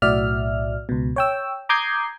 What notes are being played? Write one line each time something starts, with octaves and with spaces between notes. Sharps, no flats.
B1 A2 F#4 D5 E5 F6
C#2 B2
C#5 G5 E6
A#5 D6 D#6 G6 G#6 C7